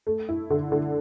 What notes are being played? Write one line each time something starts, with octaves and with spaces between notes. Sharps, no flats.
A3
E4
D3
D3